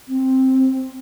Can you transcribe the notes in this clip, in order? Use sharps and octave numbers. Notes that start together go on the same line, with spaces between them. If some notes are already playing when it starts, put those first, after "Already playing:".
C4